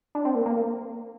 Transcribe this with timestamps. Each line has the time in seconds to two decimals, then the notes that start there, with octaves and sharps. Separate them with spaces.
0.15 D4
0.25 C4
0.35 A#3
0.46 A#3